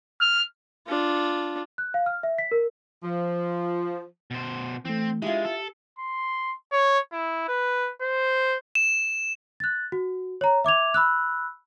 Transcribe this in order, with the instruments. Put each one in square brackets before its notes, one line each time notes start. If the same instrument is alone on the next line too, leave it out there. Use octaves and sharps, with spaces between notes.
[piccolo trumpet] F6
[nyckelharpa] D4 F4
[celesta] F#6
F5
F6
E5
B6
A#4
[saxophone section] F3
[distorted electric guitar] B2 C5
[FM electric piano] E3 A3 [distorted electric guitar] C4
[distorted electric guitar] G#3 [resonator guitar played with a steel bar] E4 F4 [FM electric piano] G4
[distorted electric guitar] A4
[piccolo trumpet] C6
C#5
E4
B4
C5
[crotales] E7
[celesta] F#6 A6
F#4
C#5 A#5
E5 D6 G#6 F7
B5 E6 F#6